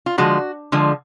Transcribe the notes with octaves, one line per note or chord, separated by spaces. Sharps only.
F4
D3 F3 G#3 F#4
D3 F3 G#3